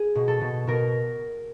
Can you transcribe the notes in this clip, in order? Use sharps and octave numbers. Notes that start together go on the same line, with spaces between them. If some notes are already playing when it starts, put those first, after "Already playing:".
Already playing: G#4
B2
A4
B2
B2 A#4